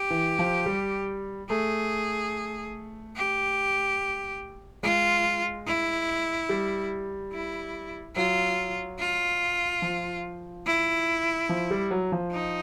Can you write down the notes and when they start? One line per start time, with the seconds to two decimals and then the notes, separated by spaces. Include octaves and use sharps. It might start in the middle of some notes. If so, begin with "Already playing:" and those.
Already playing: G4
0.10 E3
0.39 F3
0.66 G3
1.50 A3 G#4
3.17 G4
4.83 G#3 F4
5.67 E4
6.49 G3
7.33 E4
8.16 F#3 F4
8.99 F4
9.82 F3
10.66 E4
11.49 F3
11.71 G3
11.91 F#3
12.12 F3
12.32 D#4